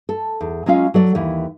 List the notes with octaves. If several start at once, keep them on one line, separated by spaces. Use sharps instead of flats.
A4
E2
F#3 G#3 C#4 F4 F5
F#3 A4 D5
D#2 E3